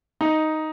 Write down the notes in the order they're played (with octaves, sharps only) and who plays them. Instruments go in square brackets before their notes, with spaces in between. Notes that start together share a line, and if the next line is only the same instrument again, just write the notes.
[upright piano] D#4